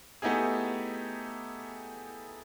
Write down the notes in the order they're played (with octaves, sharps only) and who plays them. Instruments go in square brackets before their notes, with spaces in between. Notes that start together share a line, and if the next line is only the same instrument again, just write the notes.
[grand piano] A3 B3 D#4 E4 G4 G#4